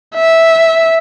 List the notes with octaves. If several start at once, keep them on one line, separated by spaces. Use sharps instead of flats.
E5